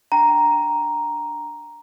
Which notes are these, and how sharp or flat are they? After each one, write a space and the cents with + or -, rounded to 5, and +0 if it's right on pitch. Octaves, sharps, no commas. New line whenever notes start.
D4 +0 G5 +0 A#5 +0